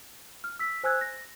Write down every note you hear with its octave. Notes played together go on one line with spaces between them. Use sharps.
F6
E6 B6
C5 G#5 E6 F#6 G#6
A#6